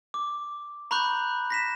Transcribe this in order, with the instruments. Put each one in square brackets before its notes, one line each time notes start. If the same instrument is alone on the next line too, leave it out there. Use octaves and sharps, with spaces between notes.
[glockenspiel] D6
A#5 B5 C#6 F#6 G6
A#6 B6 E7